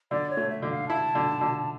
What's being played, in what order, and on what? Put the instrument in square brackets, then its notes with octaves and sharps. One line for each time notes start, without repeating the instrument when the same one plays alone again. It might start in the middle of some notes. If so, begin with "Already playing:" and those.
[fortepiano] D3 [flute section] D5
[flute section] C#5
[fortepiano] A3
[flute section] E5
[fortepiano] D3
[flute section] F5
[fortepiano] E4 [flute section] A5
[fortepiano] D3
D3